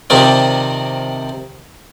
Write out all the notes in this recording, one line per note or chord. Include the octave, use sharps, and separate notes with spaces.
C3 D#3 F3 C4 D5